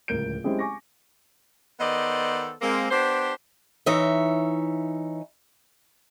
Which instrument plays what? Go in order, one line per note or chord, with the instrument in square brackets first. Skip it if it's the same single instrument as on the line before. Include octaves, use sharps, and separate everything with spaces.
[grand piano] D1 C#2 A#4 G6 D7
G#3 C4 C#4 E4 G4 G#4
G#5 C#6 D6 A#6
[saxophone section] D#3 B3 A4 C5 D5 D#5
G#3 A#3 C4
B3 D4 G4 C5
[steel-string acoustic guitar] E3 D#4 C#5 E5